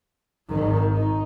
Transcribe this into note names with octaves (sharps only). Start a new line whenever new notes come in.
G#1 D#3
D#4